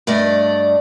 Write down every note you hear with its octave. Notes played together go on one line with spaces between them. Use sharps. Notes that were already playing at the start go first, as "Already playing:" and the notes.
G2 A3 D5 D#5